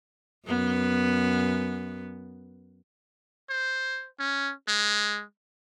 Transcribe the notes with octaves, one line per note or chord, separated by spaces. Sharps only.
F#2 B3
C5
C#4
G#3